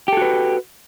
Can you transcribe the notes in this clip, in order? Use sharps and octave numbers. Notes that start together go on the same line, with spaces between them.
F#4 G4 A4 B4